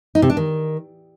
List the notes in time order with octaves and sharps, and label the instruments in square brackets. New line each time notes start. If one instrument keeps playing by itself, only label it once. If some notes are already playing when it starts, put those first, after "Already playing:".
[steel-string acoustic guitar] D#4
C3
D4
D#3